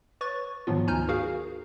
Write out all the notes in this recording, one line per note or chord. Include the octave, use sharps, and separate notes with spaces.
B4 C#5 C#6 A6
G#2 D#3 F3 F#3 B3 F4
D2 D#4 G#5 A#5 F6 G6
F#4 G#4 A#4 F5